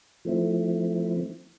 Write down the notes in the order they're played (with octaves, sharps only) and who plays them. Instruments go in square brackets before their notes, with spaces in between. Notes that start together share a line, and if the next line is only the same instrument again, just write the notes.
[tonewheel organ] F3 A3 C4 E4